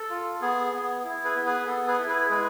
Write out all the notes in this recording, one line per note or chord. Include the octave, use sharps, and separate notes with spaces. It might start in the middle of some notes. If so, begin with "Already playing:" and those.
Already playing: A4
F4
B3 G#4
B3
E4
G#4 B4
B3
G#4 B4
B3 A4
G#4 B4
E4
G#4 B4
G#3 G#4 B4